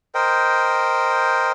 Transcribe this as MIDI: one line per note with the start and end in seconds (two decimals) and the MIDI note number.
0.15 1.52 70
0.15 1.52 72
0.15 1.52 75
0.15 1.52 79